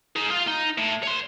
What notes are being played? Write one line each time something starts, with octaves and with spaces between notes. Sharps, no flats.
D#4 G#4
F4 F5
D#4
A2
C#5 C6